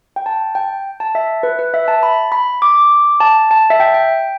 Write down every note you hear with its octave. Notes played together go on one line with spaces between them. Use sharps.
G5
A5
G5
A5
E5
B4
B4
E5
A5
B5
B5
D6
A5
A5
E5
G5
G5